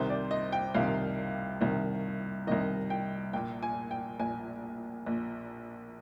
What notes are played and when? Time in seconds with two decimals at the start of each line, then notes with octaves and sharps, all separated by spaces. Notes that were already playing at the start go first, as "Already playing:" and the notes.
Already playing: C2 C3 D#3 C5
0.10 D5
0.31 D#5
0.52 G5
0.74 C2 C3 D#3 F5
1.61 C2 C3 D#3
2.47 C2 C3 D#3 D#5
2.90 G5
3.33 A#1 A#2 G5
3.63 G#5
3.91 G5
4.19 A#1 A#2 G#5
5.06 A#1 A#2